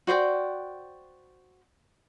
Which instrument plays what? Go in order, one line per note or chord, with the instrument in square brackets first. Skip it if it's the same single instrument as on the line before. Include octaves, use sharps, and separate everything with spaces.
[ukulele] F#4 C5 D5 G5